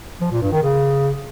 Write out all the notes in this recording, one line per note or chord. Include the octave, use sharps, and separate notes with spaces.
F3
A#2
G2
D#3
C#3